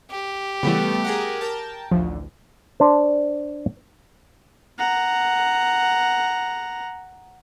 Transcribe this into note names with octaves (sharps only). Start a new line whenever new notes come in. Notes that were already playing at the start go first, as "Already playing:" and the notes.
G4
C#3 E3 G3 A3 B3
G#4 A#4 F#5
A#4 G5 A5
A1 D2 F3
D4 C5
F#5 A#5